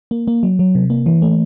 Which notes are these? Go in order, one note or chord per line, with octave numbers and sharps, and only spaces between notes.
A#3
A#3
F#3
F#3
C3
A#3
E3
A3